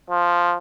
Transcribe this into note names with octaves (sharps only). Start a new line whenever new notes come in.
F3